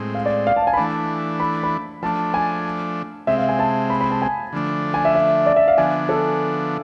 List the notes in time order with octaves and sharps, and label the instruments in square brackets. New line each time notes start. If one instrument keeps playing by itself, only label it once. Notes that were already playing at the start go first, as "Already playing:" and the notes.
Already playing: [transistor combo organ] A2 G#3 C4
[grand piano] F5
D5
F5
A5
F5
G#5
B5
[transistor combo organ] E3 A3 D4 [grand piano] A5
[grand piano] B5
B5
[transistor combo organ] F3 A3 D4 [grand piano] A5
[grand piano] G#5
[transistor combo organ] C3 G#3 C4 [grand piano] E5
[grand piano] F5
G#5
A5
B5
B5
A5
G#5
[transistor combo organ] D3 F3 A3 D4
[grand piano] G#5
E5
E5
D5
E5
F5
[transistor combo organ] D3 F3 B3 D4 [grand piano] G#5
[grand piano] A4